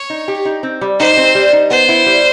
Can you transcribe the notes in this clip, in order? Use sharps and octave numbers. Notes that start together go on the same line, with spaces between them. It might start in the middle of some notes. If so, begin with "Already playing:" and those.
Already playing: C#5
D#4
G4
D#4
C4
G3
D#4 C5
C4
G3
D#4
B3 C5
E4
G3